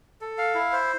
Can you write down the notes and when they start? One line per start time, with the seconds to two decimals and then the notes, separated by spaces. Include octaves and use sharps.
0.21 A4
0.38 F5
0.55 E4
0.72 C5